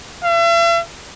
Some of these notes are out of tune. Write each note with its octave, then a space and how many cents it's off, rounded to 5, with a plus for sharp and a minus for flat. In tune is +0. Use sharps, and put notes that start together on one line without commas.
E5 +45